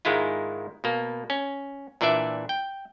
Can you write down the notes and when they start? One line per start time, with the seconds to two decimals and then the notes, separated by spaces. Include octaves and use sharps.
0.05 G#2 D#3 G#3 E4 F4
0.84 B2 A#3
1.30 C#4
2.01 A#2 E3 D4 D5 E5
2.49 G5